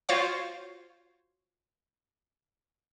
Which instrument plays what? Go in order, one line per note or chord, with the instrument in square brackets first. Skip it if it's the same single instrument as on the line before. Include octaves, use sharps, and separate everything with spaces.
[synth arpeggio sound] F4 F#4 C5 C#5 F5 C#6